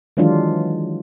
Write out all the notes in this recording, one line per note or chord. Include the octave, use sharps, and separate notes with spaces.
D#3 E3 F#3 G#3 D4 F4